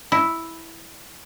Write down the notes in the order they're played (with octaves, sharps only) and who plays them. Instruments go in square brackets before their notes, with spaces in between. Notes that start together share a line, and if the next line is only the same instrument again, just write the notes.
[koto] E4